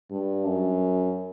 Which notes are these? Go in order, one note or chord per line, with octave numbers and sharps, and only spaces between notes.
G2
F#2